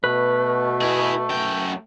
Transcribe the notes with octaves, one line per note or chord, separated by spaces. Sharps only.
B2 A3 B4
E4 G#4
F#2 G5